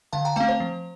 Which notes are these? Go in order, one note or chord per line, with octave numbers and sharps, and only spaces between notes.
D3 F5 A5
G5 A#5
A3 C4 F5 A5
C5
F3